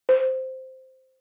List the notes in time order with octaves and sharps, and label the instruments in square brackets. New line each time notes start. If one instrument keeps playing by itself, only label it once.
[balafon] C5